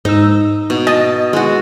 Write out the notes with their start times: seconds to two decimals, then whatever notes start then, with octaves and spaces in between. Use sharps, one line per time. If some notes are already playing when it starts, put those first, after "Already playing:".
0.05 G#2 D#4 E6
0.70 B2
0.87 D#5 A5
1.33 G#3 F#4